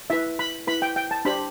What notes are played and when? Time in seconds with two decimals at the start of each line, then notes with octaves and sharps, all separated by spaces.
0.10 E4 B4 E5
0.39 B5
0.67 E4 B4 B5
0.82 G5
0.96 G5
1.11 A5
1.25 D4 G4 C5 B5